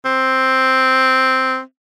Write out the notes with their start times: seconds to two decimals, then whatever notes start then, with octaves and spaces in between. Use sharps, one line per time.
0.05 C4